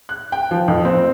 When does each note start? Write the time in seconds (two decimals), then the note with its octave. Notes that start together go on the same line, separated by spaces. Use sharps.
0.09 F#6
0.32 G5
0.51 F3
0.68 F2
0.85 C4